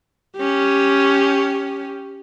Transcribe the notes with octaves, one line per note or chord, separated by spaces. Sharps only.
C#4 G4